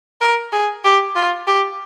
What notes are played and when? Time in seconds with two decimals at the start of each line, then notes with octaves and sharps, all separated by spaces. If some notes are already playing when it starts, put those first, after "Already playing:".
0.21 A#4
0.53 G#4
0.84 G4
1.15 F4
1.47 G4